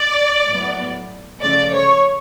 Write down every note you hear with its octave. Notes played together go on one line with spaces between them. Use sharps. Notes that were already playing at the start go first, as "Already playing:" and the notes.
Already playing: D5
A2 F#3 B3
C#3 F3 A3 D5
C#5